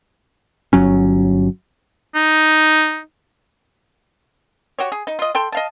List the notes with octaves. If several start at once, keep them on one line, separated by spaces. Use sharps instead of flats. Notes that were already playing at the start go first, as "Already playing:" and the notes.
G1 F#3 C#4
D#4
F#4 G4 C#5
G#4
D#4
F4 D#5
A4 G5 C6
D#5 F5 A5